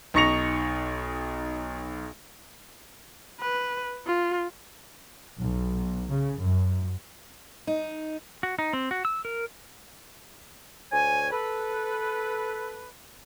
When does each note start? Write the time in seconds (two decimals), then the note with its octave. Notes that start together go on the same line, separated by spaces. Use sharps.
0.14 B1 D#4 C#6 A#6 C#7 F7
3.40 B4
4.07 F4
5.38 B1
6.11 C#3
6.41 F#2
7.67 D#4
8.43 F#4
8.59 D#4
8.73 C4
8.91 F#4
9.05 E6
9.25 A#4
10.92 D2 C#5 G#5
11.32 A4 B4